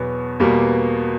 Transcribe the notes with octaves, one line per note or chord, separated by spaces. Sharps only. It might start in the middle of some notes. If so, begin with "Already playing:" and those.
Already playing: E2 B2 F#3 B3
E2 B2 G3 A#3